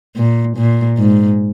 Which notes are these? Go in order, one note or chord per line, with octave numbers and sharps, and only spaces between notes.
A#2
A#2
G#2